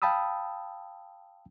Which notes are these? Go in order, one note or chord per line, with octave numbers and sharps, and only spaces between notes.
F5 G5 A5 B5 D#6 E6